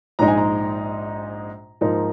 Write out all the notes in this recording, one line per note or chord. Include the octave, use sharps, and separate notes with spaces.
A#1 G#2 G#3 D#4 A#5
G#5
A#5
G#2 F3 A#3 D#4